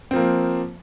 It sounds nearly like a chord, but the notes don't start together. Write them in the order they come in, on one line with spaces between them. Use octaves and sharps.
C4 F3 A#3